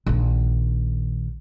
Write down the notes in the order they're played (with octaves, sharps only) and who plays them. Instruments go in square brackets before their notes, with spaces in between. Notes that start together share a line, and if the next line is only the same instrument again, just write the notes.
[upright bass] A#1 D#3